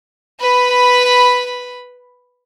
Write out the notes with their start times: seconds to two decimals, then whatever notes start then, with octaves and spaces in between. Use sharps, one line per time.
0.41 B4 B5